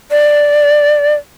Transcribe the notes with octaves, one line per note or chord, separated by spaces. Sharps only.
D5